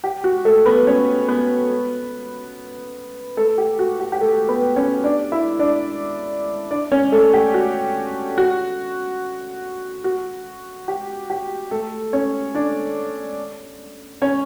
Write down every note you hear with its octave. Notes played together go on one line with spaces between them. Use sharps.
G4
F#4
A3 A4
B3 B4
C#4 C#5
B3 B4
A3 A4
G4
F#4
G4
G4
A3 A4
B3 B4
C#4 C#5
D4 D5
E4 E5
D4 D5
D4 D5
C#4 C#5
A3 A4
G4
F#4
F#4
F#4
G4
G4
A3 A4
C#4 C#5
D4 D5
C#4 C#5